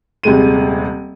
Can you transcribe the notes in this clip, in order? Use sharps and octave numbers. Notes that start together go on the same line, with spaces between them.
D#1 C3 G#3 D#7